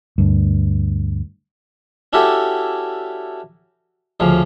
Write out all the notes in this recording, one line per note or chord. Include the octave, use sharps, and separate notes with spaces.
D2 G2
C#4 D4 E4 F#4 G4 A4
D2 C#3 F3